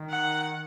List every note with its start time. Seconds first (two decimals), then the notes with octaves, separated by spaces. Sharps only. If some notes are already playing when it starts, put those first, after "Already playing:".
Already playing: D#3
0.11 F#5